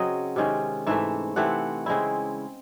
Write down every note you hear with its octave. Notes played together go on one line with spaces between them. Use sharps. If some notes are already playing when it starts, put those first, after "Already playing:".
Already playing: C#3 F#3 C4 D#5
C3 D#3 G#3 C#4
G#2 E3 A3 E5
C3 E3 A3 C4 F#5
C#3 G#3 C4 E4